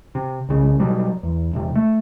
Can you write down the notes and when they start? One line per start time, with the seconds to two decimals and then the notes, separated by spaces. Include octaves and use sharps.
0.15 C3
0.49 C2 C#3
0.80 B2 F#3 G3
1.23 E2
1.53 E1 C3
1.76 A3